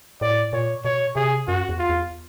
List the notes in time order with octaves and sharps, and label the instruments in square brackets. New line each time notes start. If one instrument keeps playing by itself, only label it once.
[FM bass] A2 [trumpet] D5
[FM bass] A#2 [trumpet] C#5
[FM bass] B2 [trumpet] C#5
[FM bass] C3 [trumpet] G#4
[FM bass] F#2 [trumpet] F#4
[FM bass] E2
[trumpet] F4
[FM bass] E2